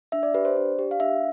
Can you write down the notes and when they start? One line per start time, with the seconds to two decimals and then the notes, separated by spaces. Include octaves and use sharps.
0.12 D4 E5
0.23 D5
0.34 G4 B4
0.45 C5
0.57 D4 D5
0.79 G4
0.91 F5
1.00 D4 E5